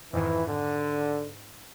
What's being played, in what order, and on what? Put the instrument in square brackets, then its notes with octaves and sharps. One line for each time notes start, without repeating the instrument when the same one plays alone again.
[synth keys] F2 G#2 D#3 [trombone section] E3
[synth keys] G#2 [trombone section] D3